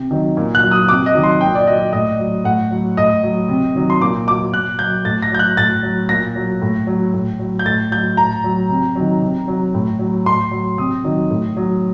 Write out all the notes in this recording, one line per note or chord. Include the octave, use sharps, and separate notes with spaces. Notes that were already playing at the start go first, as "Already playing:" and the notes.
Already playing: C3
D#3 F#3
A#2
F#6
F#3
D#6
C3 D6
D#5
D#3 F#3
C6
A#2 G5
D5
F#3 D#5
A2 D#5
F#3
A2 F#5
F#3
A2 D#5
F#3
C3
D#3 F#3
C6
A#2 D6
F#3 D6
A#2 F#6
F#3 G6
A2 A6
A#6
F#3 G6
F#6
A2 A6
F#3
A#2 A#6
F#3
A2
F#3
A2
F#3
G6
A2 A6
F#3 G6
A2 A#5
F#3
C3
D#3 F#3
C3
F#3
A2
F#3
A2 C6
F#3
C3 D#6
D#3 F#3
A2
F#3